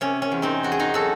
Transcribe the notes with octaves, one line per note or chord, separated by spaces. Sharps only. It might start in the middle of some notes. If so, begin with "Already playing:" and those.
C3 C#4
C#4
E2
C4 D#4
E2 F#4
G#4
D#4 F#4
F#3 F#4 A4